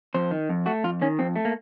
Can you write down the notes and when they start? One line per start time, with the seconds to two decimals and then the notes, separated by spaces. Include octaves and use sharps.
0.14 F2 C5
0.31 D#3
0.49 F2
0.66 A3 F#4
0.84 F2 F4
1.02 D#3 C#4
1.19 F2 C4
1.36 A3
1.45 A#3